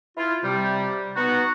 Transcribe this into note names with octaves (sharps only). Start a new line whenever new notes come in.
E4 F4
C3 G3
B3 D#4 F#4